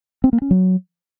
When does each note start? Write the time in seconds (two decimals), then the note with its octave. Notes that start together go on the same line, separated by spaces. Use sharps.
0.24 C4
0.33 A#3
0.42 C#4
0.51 F#3